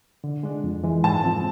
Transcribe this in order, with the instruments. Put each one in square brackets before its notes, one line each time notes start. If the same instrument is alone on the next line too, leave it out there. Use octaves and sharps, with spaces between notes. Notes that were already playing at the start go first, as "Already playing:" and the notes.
[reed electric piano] D3
G#3 D4
F2
E3 G#3
[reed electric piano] G#2 [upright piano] A5
[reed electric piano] F3 G#3 C4